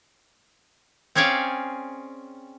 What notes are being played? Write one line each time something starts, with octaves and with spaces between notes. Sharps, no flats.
C4 C#4 G#4 C#5 D5 F5